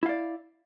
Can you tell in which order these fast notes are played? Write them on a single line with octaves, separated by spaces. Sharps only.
E4 F5 D5